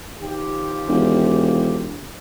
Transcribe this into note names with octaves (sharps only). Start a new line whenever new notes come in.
D#3 F3 G4
E1